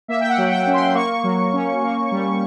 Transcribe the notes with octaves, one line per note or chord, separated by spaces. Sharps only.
A#3 E5
G5
F#5
F#3
G5
C#4
C6
A#3 C#6
F#3
C#4
A#3
G3